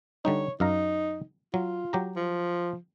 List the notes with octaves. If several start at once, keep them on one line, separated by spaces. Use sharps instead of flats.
D3 G3 D#4 C#5
F#2 D#4 F5 A#5
F#3 F4
F#3 G4 A#5
F3